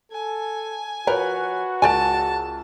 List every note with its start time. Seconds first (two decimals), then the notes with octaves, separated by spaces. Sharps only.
0.12 A4 G#5
1.07 F3 F#4 A#4 B4 C#5
1.82 C#2 A#4 D5 G#5 A5